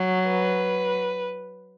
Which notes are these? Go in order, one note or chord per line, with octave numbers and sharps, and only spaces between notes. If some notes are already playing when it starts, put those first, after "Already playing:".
Already playing: F#3
B4